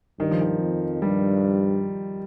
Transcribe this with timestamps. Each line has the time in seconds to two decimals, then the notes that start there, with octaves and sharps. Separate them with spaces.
0.20 G2 D#3
0.31 F3
0.41 D#3
0.61 F2
1.02 G2 G3